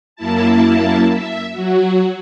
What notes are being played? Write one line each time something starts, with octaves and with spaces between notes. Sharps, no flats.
F#2 A#3 E4 A5
E5
F#3 F#4